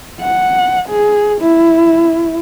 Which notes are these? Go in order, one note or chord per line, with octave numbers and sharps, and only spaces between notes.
F#5
G#4
E4